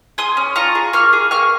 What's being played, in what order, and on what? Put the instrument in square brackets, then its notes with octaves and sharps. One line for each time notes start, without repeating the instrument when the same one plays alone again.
[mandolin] G#4 C6 D#6
C#4
F4 A#5 C#6
G#4
A#3 C#6 F6
G#4
A#3 C#6 F6